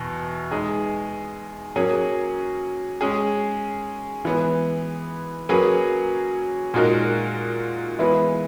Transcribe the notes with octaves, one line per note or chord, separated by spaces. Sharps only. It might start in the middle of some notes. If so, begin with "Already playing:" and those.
Already playing: E2 B2
G#3 D#4 G#4
F#3 A#3 C#4 G#4
G#3 C#4 G#4
E3 G#3 B3
F#3 A#3 C#4 G#4 B4
A#2 G#3 D#4 F#4 A#4
E3 G#3 B3 E4 B4